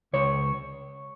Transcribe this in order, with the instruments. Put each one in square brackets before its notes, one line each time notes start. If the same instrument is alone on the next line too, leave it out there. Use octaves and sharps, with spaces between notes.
[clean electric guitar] C#2 C#5